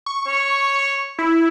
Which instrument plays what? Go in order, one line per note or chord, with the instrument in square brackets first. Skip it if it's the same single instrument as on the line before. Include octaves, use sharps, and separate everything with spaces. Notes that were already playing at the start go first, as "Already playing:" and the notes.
[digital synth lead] C#6
[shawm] C#5
[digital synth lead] E4